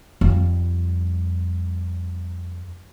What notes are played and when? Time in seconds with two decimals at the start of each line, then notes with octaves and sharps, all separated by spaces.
0.21 F2 G3